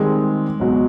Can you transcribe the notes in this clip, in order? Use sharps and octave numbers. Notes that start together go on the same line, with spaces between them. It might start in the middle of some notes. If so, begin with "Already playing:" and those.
Already playing: D#3 G3 G#3 C4
C#2 B2 F#3